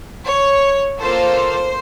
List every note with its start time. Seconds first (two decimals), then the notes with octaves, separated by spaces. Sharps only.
0.26 C#5
1.00 A#3 F4 A4 C5